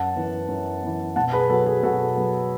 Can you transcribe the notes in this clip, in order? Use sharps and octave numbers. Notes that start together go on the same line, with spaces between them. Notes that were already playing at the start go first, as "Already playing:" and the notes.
Already playing: F#2 F#5 A5
E3 B3
F#2
E3 B3
B2 F#5 A5
G#4 B4
F#3 B3 F#4 A4
G#4
B2 F#4 A4
F#3 B3